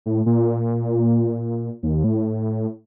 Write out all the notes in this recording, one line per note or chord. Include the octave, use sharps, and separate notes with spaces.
A2
A#2
D#2
A2